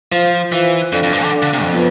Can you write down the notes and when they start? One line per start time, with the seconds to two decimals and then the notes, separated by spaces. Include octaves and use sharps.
0.12 F3 F4 C5 F5
0.52 E3 F4 C5 F5
0.92 F2 D4 A4 D5 F5
1.03 F2
1.13 G2
1.23 D3
1.32 D4 A4 D5 F5
1.42 D3
1.53 C3
1.62 F2
1.73 B3 F4 B4